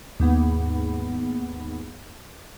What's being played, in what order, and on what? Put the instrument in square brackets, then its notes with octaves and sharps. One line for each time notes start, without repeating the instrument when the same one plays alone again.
[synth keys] D#2 G#2 B3